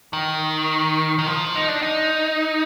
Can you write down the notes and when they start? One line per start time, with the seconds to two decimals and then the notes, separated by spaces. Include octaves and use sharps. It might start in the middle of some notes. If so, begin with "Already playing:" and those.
0.13 D#3
1.19 D#3
1.27 F3
1.55 D#4
1.69 D4
1.83 D#4